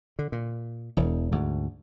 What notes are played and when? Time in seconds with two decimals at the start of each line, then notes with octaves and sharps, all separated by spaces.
0.19 D3
0.32 A#2
0.97 E1 E2
1.32 D2 G#2